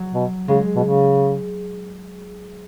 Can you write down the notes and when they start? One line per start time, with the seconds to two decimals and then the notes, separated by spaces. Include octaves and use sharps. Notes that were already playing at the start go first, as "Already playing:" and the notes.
Already playing: F#3
0.14 B2
0.48 C#3 G#3
0.76 B2
0.83 C#3